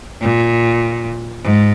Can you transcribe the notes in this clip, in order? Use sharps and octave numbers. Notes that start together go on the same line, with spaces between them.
A#2
G#2